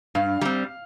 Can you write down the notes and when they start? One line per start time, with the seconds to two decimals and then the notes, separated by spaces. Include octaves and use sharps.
0.15 G2 F5
0.41 G3 C4